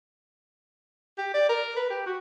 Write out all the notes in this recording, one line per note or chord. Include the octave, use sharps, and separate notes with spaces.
G4
D5
A#4
B4
G4
F#4